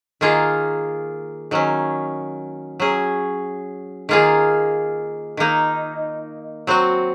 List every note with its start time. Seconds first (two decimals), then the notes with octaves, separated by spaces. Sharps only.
0.21 D#3 A#3 F4 G#4
1.51 D#3 F#3 C#4
2.80 F#3 C#4 G#4
4.09 D#3 A#3 F4 G#4
5.37 D#3 A#3 D#4
6.67 F#3 C4 F#4